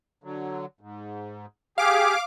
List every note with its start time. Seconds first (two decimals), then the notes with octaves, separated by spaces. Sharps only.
0.24 D3 F#3
0.81 G#2
1.78 G4 G#4 F5 D6